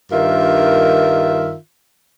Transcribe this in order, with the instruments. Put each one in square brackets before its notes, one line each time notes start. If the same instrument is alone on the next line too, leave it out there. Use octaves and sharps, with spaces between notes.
[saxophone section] G2 D#3 F4 A#4 E5